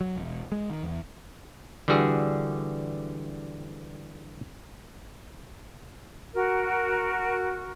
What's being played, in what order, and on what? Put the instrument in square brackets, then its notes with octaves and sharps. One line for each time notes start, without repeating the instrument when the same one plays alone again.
[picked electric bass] F#3
E1
G#3
D#3
E2
[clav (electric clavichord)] D3 E3 G3 F#4 G#4
[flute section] F#4 A#4